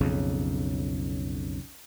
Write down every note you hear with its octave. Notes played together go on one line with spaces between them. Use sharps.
B1 F2 C#3